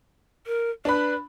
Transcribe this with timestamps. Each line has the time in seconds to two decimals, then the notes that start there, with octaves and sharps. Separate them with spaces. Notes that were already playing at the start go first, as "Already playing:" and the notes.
0.47 A#4
0.85 D4 B4 B5